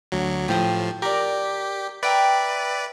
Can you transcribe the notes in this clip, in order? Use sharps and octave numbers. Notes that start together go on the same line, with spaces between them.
D2 F#3
A2 F3 G4 D#6
G4 A#4 D5
B4 D5 E5 G5 A#5